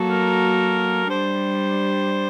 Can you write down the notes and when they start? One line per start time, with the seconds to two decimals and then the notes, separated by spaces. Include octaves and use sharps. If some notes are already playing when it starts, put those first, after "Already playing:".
Already playing: F#3 A#3 F#4 A4
0.10 A#4
1.10 G3 D4 G4 C5